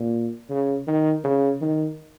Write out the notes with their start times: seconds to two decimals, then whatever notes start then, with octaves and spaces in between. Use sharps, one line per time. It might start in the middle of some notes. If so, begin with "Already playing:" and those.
Already playing: A#2
0.50 C#3
0.87 D#3
1.24 C#3
1.61 D#3